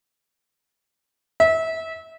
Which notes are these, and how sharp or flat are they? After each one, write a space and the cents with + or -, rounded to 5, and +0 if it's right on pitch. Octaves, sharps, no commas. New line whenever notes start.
E5 -25